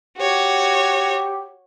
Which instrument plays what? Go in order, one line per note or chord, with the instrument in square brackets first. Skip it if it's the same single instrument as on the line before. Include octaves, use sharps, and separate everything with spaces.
[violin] F#4 C#5 [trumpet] G4